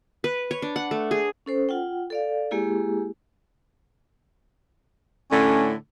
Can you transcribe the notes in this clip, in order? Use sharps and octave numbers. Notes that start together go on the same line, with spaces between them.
B4
C#5
D4
F#5
A3
G#4
C#4 A4 C5
F4 F#5 G5
A4 D5 F5
G#3 A#3 E4 G4 G#4
A2 D3 C#4